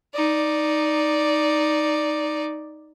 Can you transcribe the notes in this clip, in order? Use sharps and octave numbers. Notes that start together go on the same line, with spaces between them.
D#4 D5